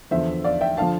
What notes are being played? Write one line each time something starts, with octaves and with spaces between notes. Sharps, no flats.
E2 D3 F3 C5 E5
D5 F5
E5 G5
D3 F3 F5 A5